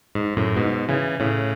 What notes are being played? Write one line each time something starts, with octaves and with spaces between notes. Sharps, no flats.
G#2
F#2 A2
G#2 B2
C#3 E3
A2 C#3